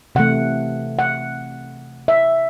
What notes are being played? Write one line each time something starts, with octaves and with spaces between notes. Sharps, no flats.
C3 E3 A3 F#5
F#5
E5